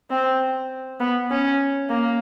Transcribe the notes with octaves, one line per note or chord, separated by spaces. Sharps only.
C4
B3
C#4
A#3